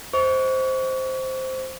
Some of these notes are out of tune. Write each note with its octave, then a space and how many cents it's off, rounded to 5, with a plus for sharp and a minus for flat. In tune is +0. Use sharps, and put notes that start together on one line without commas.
C5 +0 D#5 +35 C#6 +35